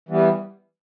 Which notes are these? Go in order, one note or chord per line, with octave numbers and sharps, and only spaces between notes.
E3 G3 B3